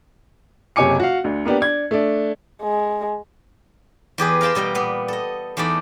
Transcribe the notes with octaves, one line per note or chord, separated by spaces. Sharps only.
F#1 C3 C#5 G#5 D6 C#7
F#4 F5
D2 D3
A#3 B3 D4 G4
D4 G#6
A3 D4
G#3
E2 G4 G#4 B4
A#4 F5 G5 A5 C6
B2 G3 A#4 D#5
A#2 B3
A4 D#5
E2 A3 D#4 D5 B5